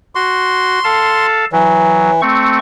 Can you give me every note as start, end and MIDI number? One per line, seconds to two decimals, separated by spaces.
0.15 0.79 66
0.15 1.26 84
0.84 1.45 69
0.84 1.45 77
0.84 1.45 81
1.52 2.21 52
1.52 2.10 54
2.22 2.59 57
2.22 2.59 60
2.22 2.59 85